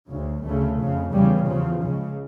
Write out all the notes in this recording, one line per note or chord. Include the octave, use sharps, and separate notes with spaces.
D2 C#3
D2 C#3 A3
F2 C#3
E2 C#3 G3
E2 C#3 F3
C#2 C#3